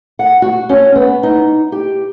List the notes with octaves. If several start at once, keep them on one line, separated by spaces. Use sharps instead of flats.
F#5
F#4
C#4
B3
D#4
G4